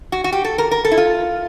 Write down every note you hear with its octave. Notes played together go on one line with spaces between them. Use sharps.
F#4
F#4
G4
A4
A#4
A#4
A4
E4
F4